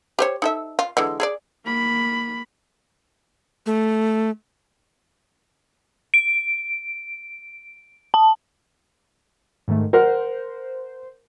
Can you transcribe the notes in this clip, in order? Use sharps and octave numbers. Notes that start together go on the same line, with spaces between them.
G4 C5 C#5
D#4 A4 E5
F4
D3 E3 G#3
G#4 A4 D5
A#3 B5
A3
D7
A5
G#2 D#3 A3
A#4 C5 F#5 F6